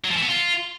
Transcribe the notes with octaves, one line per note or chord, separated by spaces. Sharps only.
F#3
F3
E3
B3
F4